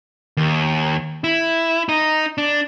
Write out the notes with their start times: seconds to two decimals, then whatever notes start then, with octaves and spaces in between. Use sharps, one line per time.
0.37 D#2
1.24 E4
1.89 D#4
2.38 D4